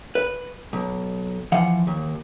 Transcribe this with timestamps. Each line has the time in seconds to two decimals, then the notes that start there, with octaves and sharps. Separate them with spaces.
0.15 B4
0.73 B1
1.52 E3 F3 F5 F#5
1.87 D#2